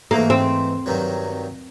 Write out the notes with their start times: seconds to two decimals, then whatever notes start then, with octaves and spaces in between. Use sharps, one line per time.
0.11 G#2 E3 A3 A#3
0.30 C4
0.86 G2 D#3 F#3